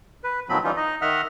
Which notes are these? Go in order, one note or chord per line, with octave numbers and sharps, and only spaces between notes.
B4
D#2 B2 F3 F#3 C4 B5
E3 G3 C#4 D#4 F4
D#4 D#5
D#3 D#5 E5 F#5 F6